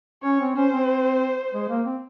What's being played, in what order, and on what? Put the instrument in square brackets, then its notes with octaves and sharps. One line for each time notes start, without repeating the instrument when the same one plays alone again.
[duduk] C#4 [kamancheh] C#5
[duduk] C4
[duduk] C#4 [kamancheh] C5
[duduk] C4
G#3
A#3
C4